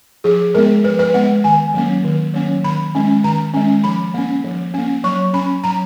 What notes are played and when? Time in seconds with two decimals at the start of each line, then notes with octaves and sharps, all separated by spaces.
0.24 F3 G#4
0.54 G#3 B3 A#4
0.84 F3 B4
0.99 B4
1.14 G#3 B3 F#5
1.44 D#3 G#5
1.74 F#3 A#3 C#4
2.05 D#3
2.34 F#3 A#3 C#4
2.64 D#3 B5
2.95 G#3 C#4
3.24 D#3 A#5
3.54 G#3 C#4
3.84 F3 B5
4.14 A#3 C#4
4.44 F3
4.74 A#3 C#4
5.04 F#3 C#6
5.34 C#4 B5
5.64 F#3 A#5